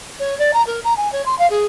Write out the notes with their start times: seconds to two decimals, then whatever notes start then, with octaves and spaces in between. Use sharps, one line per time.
0.19 C#5
0.38 D5
0.53 A#5
0.67 A#4
0.84 A#5
0.97 G#5
1.12 C#5
1.26 C6
1.39 F5
1.50 G#4